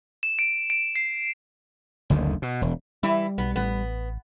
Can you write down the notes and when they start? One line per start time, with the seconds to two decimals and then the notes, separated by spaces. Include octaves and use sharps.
0.23 E7
0.39 D7
0.70 D7
0.96 C7
2.10 F#1 D2 D3 D#3
2.42 B2
2.62 E1
3.03 E3 G3 E4
3.38 B1 B3
3.56 A1 B3